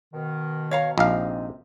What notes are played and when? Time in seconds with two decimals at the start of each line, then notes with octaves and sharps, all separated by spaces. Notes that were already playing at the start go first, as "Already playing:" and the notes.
0.13 B2 D#3
0.71 C#5 F5 A#5
0.98 A#1 C3 G#3 C4 D#4 F5